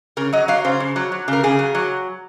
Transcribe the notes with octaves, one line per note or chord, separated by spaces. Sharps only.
C#3 A#4
F#3 D#5
F#3 F5
C#3 C5
C#3
F#3
F#3
C#3 A#4
C#3 G#4
F#3
F#3